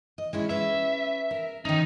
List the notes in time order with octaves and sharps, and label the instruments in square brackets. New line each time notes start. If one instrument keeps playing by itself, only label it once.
[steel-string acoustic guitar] D#5
G#3 C#4 E4
[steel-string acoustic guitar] C#4 B4 [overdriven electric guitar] E5
[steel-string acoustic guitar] A#4
[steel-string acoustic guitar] D#3 C#4 [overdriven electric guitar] D#4